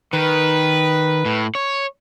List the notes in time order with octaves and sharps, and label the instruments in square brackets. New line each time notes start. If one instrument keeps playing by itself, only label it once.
[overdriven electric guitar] D#3 [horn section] B4
[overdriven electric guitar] A2
C#5